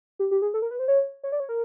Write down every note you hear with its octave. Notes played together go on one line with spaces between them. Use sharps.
G4
G4
G#4
A4
A#4
B4
C5
C#5
C#5
D5
C#5
A#4